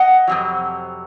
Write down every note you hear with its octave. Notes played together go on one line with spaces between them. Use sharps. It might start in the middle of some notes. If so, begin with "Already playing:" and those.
Already playing: D#5 F#5
F2 C3 F#3